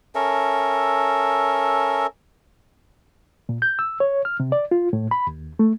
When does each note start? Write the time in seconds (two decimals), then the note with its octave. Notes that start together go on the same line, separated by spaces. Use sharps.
0.15 C#4 A4 A#4 E5
3.49 A#2
3.62 G6
3.79 E6
4.00 C#5
4.25 F6
4.40 C3
4.52 D5
4.71 F4
4.93 A2
5.11 B5
5.27 D#2
5.59 A3